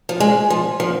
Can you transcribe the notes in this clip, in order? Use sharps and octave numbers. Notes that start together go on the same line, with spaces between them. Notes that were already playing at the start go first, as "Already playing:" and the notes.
F3
G#3
F3
F3